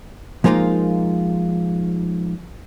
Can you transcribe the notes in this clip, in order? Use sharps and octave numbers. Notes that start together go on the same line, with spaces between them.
F3 G#3 A#3 D#4 F4